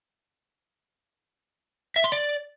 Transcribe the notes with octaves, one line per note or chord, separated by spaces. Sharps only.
E5
C6
D5